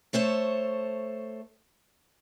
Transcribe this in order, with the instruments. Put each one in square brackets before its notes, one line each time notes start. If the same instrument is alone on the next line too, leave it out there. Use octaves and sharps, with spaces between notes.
[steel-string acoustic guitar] A3 A4 C5 C#5